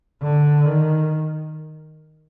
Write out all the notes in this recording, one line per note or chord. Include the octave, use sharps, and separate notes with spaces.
D3
D#3